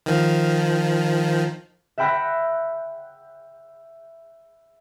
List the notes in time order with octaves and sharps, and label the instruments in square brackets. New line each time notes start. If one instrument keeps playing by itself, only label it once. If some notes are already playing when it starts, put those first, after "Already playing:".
[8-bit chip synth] D#3 F3
[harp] E5 F#5 G5 B5 F#6 A#6